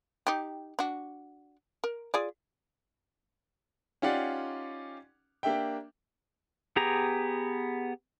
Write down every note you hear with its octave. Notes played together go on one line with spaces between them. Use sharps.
D#4 G4
D4 F#4
A#4
F4 G#4 D5
C#4 D#4 F4 G4 D5 F#5
A#3 D4 G4 E5 G5
B3 G4 G#4 A#5